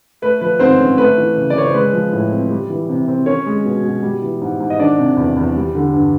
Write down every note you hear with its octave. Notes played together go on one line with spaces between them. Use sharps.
A3 B4
F3 B4
G#2 C4 C5
C#4
A3 B4
E3
C#3
D5
C#3 C#5
C5
G#3 B4
F3
A2
C4
G3
E3
C3
C4
C#4 C#5
G#3
B2
B2
G3
E3
G#2
G#2
D#5
D#3 D4 D5
C3
E2
E2
G3
D3
G2